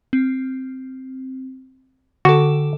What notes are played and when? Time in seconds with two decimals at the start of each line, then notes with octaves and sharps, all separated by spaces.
0.13 C4
2.25 D3 F#4 A4